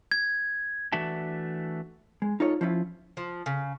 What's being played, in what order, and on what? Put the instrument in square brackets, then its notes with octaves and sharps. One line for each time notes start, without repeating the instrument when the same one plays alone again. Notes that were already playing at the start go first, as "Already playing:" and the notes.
[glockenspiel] G#6
[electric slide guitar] E3 A3 D4 F#4 E5 A5
[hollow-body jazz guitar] G#3
D#4 F4 A4 C#5
F3 C#4 E4 F4
[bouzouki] F3
C#3